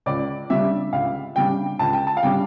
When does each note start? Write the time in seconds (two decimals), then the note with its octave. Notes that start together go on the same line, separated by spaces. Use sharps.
0.06 C#2 D5
0.50 C#3 G3 D4 E5
0.93 C#2 F5
1.36 C#3 G3 D4 G5
1.79 C#2 A5
1.93 G5
2.07 A5
2.17 F5
2.23 C#3 G3 D4 G5